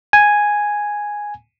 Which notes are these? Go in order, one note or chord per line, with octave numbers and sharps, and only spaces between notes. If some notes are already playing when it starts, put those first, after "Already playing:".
G#5